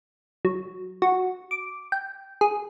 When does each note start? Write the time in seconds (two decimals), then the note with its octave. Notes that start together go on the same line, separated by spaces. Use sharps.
0.45 F#3
1.02 F#4
1.51 D6
1.92 G5
2.41 G#4